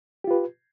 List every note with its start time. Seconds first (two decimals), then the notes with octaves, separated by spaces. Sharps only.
0.24 G4
0.27 F4
0.31 B4